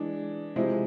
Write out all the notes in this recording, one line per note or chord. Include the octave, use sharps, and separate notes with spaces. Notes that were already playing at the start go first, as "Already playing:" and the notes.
Already playing: E3 G#3 D4
C3 F3 G#3 C4 E4